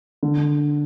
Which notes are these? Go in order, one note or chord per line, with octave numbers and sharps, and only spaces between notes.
D3